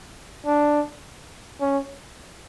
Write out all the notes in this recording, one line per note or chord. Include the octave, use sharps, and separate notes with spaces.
D4
C#4